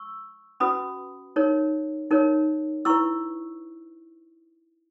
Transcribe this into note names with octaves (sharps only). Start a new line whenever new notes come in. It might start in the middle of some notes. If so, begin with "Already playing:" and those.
Already playing: C#6 E6
C#4 F#4 B4 B5 D#6
D#4 A#4 C#5
D#4 A#4 C#5
E4 B4 C#6 E6